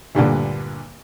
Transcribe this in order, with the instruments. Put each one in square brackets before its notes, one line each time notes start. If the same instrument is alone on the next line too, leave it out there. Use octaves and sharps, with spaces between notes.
[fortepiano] D2 G2 A#2 D3